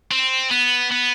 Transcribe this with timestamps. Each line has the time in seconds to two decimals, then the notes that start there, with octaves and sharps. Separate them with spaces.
0.11 C4
0.51 B3
0.92 B3